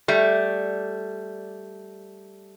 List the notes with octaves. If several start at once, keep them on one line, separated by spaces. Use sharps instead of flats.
G3 A3